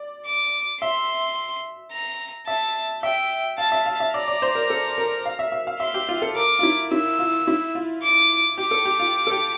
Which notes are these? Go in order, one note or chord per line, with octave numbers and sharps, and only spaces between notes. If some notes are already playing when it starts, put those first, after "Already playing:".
Already playing: D5
D6
E5 C6
A#5
E5 A5
E5 G5
F5 A5
E5
F5
E5
D5 A#5
D5
C5
A#4
A4
A#4
F5
E5
E5
F5
E5 C6
G4
F4
A4
A#4 D6
F4
E4
E4 E6
F4
E4
F4
D6
G4 D6
A4
G4
F4
A4
G4